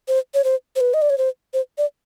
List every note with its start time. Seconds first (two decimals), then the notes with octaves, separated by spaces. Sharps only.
0.08 C5
0.34 C#5
0.44 C5
0.76 C5
0.81 B4
0.94 D#5
1.02 D5
1.10 C#5
1.18 C5
1.54 C5
1.78 D5